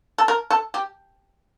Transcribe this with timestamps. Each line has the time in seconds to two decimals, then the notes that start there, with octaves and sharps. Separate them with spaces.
0.18 A4
0.28 A#4
0.50 A4
0.74 G4